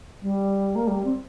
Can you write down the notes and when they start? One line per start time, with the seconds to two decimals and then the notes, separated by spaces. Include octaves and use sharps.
0.22 G3
0.75 A#3
0.87 G3
1.05 C4